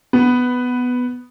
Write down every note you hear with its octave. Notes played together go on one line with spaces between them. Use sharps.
B3